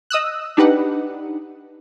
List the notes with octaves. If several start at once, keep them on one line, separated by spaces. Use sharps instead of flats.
D#5 D#6 E6 F#6
D4 D#4 G4 B4 F#5